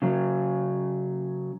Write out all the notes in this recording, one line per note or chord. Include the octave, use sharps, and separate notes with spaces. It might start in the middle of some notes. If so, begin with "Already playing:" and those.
C#3 F#3